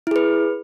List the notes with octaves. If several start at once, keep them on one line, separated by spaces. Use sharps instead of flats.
E4 G#4 B4